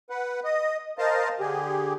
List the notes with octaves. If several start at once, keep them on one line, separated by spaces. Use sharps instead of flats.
B4 F#5
D#5
A#4 C5 D#5 F5 A5
D3 G4 G#4